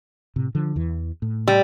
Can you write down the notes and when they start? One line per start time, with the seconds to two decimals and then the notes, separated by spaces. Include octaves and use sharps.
0.36 A2 C3
0.55 D3 F3
0.76 E2 E3
1.22 A2
1.48 G3